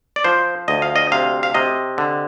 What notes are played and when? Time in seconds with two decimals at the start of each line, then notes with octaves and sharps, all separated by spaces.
0.16 D5
0.24 F3 C5
0.68 D2 D#5
0.82 F5
0.96 D#5
1.12 C3 F5
1.43 F5
1.54 C3 D#5
1.98 D3